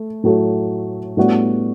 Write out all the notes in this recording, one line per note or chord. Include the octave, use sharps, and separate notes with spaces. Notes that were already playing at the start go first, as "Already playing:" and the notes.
Already playing: A3
A2 F#3 A3
A2 G3 B3 D4 F#4